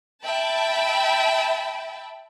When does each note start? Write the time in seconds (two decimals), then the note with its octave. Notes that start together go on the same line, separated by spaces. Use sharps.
0.24 E5 G5 A5 B5